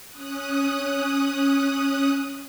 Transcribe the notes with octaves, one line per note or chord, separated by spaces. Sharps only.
C#4 D#6 F#6